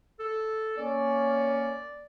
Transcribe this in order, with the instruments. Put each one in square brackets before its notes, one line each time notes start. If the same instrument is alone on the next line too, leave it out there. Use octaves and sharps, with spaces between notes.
[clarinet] A4
[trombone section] A#3 C#4 [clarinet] D5